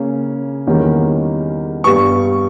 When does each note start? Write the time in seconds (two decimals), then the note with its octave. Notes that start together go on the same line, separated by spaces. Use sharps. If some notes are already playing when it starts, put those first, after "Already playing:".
Already playing: C#3 A#3 C#4
0.67 E2 D#3 G3 A#3 C#4
1.84 G2 G3 B3 C#6